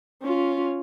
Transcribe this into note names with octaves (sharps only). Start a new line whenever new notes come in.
C#4 F4